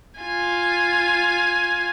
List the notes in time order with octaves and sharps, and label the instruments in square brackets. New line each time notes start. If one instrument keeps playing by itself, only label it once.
[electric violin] F4 G#5